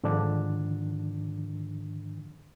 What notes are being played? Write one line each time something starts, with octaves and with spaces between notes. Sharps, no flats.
G#2 D3 D#3 F3 D4